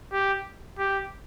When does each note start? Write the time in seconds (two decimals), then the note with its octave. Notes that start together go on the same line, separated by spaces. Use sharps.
0.13 G4
0.79 G4